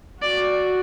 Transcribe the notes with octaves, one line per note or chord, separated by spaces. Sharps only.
F#4 D5